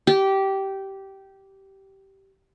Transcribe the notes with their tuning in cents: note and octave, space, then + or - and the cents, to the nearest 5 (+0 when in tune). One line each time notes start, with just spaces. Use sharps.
G4 -15